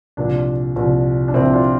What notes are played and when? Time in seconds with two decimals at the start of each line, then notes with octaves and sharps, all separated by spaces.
0.17 C2 A#2 F3 D4
0.76 C2 A#2 F3
1.28 D4
1.34 C2 A#2 F3 C4 E4
1.53 D4 F4